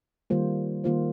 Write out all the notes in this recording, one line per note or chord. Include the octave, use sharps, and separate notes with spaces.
D#3 G3 A#3 F4 C5
D#3 G3 A#3 F4 C5